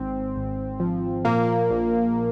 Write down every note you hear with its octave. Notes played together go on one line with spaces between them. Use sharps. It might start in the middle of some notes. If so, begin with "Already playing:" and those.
Already playing: G#1 G#2 C4
G#1
F3
A#2 A#3
A#1